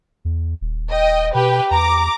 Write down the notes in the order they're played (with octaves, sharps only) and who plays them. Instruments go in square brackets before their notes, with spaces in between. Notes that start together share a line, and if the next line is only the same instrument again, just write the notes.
[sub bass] E2
D#1
[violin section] D#5 G5
[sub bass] B2 [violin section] G4 B4 G5
[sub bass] E2 [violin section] A#5 D6